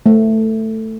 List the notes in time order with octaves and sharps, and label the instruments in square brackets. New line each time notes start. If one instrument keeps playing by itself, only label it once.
[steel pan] A3